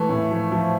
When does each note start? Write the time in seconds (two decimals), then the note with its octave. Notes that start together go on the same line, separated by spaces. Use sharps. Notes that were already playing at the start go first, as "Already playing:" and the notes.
Already playing: E3 A3
0.09 A2
0.31 F3
0.52 F3